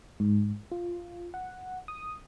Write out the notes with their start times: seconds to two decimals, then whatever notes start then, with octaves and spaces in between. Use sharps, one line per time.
0.20 G#2
0.72 F4
1.34 F#5
1.88 D#6